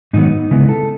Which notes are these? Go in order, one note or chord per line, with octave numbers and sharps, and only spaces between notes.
G#2 D#3 F#3 B3 D#4
C#3 G#3 B3 E4
A4